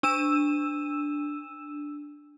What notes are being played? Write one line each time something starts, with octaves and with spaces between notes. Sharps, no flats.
D4 E6 D#7 E7